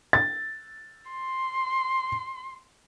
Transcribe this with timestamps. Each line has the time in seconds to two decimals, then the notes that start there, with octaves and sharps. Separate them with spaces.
0.13 A6
1.11 C6